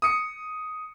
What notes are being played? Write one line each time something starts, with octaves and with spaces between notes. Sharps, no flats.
D#6 C#7